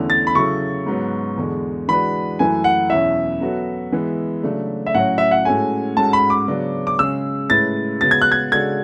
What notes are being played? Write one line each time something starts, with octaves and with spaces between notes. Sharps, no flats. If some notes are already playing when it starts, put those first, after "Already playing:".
Already playing: E2 D3 A3 C#4 E4
A6
B5
C#3 F#3 C#4 E4 A4 C#6
G#2 F#3 B3
E2 D3 G#3
E3 G#3 D4 F#4 B4 B5
F#2 E3 A3 E4 B4 G#5
F#5
E2 B2 F#3 C#4 E4 E5
F#3 B3 F#4 A4
E3 G#3 B3
C#3 F#3 A3 D4
E5
A2 F#3 C#4 F#4 F#5
E5
F#5
A2 G#3 C#4 F#4 A4 G#5
G#2 G#3 C#4 F#4 A4 A5
B5
D6
C#3 F#3 B3 D4
D6
C#3 G#3 C#4 G#4 E6
A2 G#3 C#4 E4 B4 A6
C#3 G#3 B3 F#4 A6
G#6
F#6
G#6
C#3 G#3 D4 F#4 A4 G#6